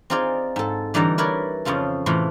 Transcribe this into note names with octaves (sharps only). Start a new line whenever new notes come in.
C4 D#4 F4 G#4 D5
G#2 A4
D3 E3 G3 D#4 D5 A#5
E4 A#4 B4 C#5 D5
F2 C#3 F3 F4 A4
A2 C3 E3 E4 F4